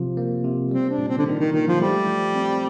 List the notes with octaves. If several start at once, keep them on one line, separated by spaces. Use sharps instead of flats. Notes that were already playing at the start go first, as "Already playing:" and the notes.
Already playing: C3 F3 F4
A#3
C3
G3 C4
D4
A#2
C4
D3
D#3 D4
D#3
A#2 D#3
F3
G3 A3
F3
C4